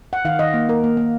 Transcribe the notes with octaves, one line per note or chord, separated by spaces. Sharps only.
F#5
D#3 F5
D#3 D#5
A#3
A#3 A#4
A#3
A#3